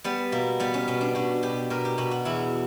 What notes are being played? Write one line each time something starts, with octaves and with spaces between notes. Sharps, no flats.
G3 B3
B2 A#3
G3 B3
C#4
B2 C#4
D4
B2 F#4
B2 G4
B2 A#4
G4
B2 F#4
F#4
E2 E4